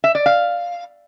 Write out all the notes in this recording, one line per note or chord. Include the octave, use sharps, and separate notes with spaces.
E5
D5
F5